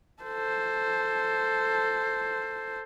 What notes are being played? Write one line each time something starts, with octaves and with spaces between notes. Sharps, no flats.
A4 C5